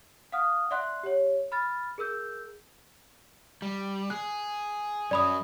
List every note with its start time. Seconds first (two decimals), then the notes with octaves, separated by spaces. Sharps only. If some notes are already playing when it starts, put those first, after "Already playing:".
0.32 F5 F#5 D#6 F6
0.71 D5 E5 F#5 C6 F#6
1.03 G4 C#5
1.52 B5 F6 A6
1.98 G#4 A#4 E6 G6
3.62 G3
4.10 G#4 F#6
5.11 F#2 F#3 D5 B5 D#6